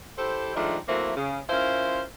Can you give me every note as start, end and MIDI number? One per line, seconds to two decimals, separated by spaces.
0.18 0.54 64
0.18 0.54 67
0.18 0.54 69
0.18 0.54 72
0.56 0.77 51
0.56 0.77 53
0.56 0.77 56
0.56 0.77 57
0.56 0.77 62
0.89 1.16 54
0.89 1.16 57
0.89 1.16 58
0.89 1.16 60
0.89 1.16 64
1.17 1.39 49
1.50 2.02 61
1.50 2.02 64
1.50 2.02 65
1.50 2.02 70
1.50 2.02 72